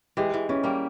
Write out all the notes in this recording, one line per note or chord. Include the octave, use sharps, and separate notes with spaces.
E3 G#3 G4
E3
E3 C#4
G3 A#3